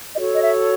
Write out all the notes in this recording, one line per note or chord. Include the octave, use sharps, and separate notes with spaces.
F#4 A4 C#5 D#5
D#5
E5